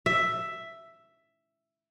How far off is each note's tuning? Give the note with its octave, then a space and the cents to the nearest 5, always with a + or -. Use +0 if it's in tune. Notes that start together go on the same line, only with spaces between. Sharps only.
E5 +5